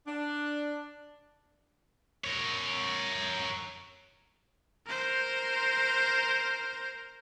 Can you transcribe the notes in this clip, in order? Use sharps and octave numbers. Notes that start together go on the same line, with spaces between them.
D4
A#4 C#5
A#4 C5